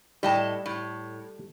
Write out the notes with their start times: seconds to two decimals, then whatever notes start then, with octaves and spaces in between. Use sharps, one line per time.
0.23 A2 G3 D#5 A5
0.66 A2